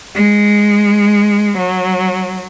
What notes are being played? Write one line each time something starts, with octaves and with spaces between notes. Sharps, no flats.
G#3
F#3